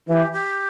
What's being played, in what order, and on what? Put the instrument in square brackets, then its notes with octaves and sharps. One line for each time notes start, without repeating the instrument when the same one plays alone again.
[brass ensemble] E3 [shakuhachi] G4
[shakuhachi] G4